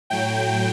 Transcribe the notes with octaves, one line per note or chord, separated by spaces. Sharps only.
A2 F#3 G5